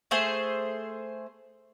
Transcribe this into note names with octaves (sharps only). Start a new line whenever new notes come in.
A3 G#4 C5